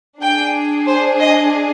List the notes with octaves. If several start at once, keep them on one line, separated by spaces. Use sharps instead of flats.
D4 G#4 G5
C5
D#5